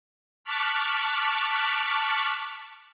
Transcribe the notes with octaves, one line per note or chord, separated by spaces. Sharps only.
A5 C#6 D6 F6 F#6 B6